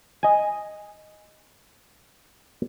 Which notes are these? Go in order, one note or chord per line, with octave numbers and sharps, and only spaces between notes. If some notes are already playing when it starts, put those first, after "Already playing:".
D#5 G#5